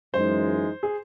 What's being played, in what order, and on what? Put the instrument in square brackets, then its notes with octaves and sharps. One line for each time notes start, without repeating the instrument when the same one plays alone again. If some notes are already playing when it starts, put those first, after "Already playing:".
[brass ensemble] F#2 E3 G#3 D#4 [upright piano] C5
[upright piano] G#4